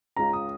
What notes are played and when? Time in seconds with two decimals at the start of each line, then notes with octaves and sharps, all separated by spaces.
0.16 C#2 C#3 G#3 F4 A#5
0.33 D#6